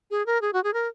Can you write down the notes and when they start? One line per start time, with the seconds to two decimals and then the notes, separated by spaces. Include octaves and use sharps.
0.11 G#4
0.26 A#4
0.41 G#4
0.53 F#4
0.64 G#4
0.74 A#4